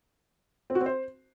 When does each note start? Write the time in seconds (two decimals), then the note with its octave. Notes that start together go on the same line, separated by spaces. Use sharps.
0.70 C4
0.75 F#4
0.81 C4
0.86 C5